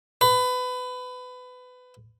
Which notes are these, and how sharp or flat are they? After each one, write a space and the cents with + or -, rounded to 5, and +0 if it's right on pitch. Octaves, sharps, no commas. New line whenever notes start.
B4 +25